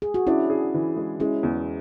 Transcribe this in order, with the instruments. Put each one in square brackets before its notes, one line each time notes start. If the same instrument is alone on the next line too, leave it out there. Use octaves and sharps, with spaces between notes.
[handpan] G#4
F#4
[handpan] C#4 E4 [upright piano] D4
[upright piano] G#4
E3
G#3
[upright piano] G#3 [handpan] C#4 E4
[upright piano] E2